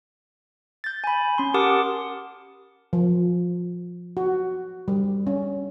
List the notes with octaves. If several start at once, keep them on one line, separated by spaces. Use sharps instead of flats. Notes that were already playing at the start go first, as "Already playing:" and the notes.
G6 A6
G#5 B5
C#4 C6
G4 A#4 F#5 A5 D6 D#6
F3
F#4
G3
C#4